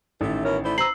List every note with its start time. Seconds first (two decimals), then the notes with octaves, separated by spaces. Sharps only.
0.21 A1 D#3 A3
0.45 B2 E4 A#4 C#5
0.64 A3 E4 C5 D5
0.78 B4 C5 A#5 E6 C7 F#7